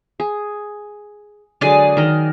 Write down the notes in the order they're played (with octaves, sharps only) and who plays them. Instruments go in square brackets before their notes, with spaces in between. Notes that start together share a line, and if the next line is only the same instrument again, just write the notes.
[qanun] G#4
[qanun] D3 F#3 G#3 [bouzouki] G#4 D5
[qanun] D#3 A#4 D#5